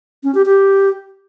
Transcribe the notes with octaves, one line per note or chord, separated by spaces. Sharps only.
C#4
G4
G4